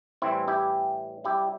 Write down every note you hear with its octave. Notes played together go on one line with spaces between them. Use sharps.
A2 E3 G3 C4 E4
E4 G4
C3 G3 E4 G4